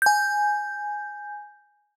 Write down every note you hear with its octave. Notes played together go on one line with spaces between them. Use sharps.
G#5 G6